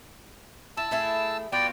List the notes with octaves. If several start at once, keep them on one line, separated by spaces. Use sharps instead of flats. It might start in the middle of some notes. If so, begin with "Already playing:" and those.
E4 A5 E6
A3 E4 G#4
B3 F4 F#4 D5 G5